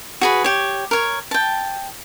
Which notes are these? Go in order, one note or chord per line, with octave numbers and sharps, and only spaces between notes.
F#4 G#4 B4
G4 C#5
A#4 C#5
G5 A5